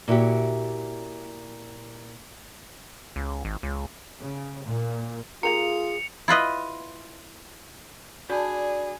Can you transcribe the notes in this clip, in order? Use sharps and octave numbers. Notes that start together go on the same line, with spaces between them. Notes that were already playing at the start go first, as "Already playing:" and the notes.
A#2 E4 F#4 G4
C#2
G#1
C#2
C#3
A#2
A#3 F4 G4 G#4 A#4 C#7 F7
E4 F4 B4 D#5
D4 F#4 G#4 D5 B5